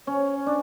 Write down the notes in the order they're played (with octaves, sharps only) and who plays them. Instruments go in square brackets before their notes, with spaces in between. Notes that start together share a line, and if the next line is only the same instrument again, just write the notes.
[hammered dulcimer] C#4 [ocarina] C#5
[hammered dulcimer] D4 [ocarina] D5